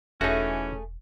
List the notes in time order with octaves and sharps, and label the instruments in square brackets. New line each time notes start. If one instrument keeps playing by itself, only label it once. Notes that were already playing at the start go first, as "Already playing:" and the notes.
[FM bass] E1 [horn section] E3 C#4 [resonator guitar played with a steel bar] A3 G#4 [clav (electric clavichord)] D#4 F#4